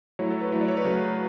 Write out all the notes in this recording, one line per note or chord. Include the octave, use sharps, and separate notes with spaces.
F#3 A3 E4 C#5
A4
B4
F#3 A3 E4 C#5
D5
C#5
B4
C#3 F#3 A3